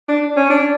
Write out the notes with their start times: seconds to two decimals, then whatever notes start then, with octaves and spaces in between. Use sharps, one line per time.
0.08 D4
0.36 C#4
0.50 D4